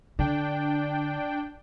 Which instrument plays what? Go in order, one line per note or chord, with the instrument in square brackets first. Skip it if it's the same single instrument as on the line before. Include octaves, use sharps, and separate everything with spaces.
[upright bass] D3 [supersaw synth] D4 G5